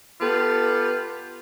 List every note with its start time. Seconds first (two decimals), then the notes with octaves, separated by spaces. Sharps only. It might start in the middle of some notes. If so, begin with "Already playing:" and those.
0.21 B3 F4 G4 A4 B4